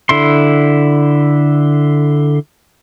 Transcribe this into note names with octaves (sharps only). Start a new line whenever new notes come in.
D3 E4 C6